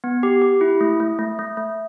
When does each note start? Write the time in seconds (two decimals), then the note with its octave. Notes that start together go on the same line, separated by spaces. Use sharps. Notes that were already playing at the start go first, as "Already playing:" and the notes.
0.04 B3
0.23 G4
0.42 G4
0.61 E4
0.81 A3
1.00 A3
1.19 A3
1.39 A3
1.57 A3